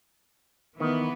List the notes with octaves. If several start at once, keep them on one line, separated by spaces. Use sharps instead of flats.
D#3 E3 B3